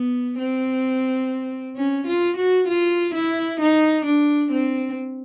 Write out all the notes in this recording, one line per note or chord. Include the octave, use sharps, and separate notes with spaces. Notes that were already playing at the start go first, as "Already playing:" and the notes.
Already playing: B3
C4
C#4
F4
F#4
F4
E4
D#4
D4
C4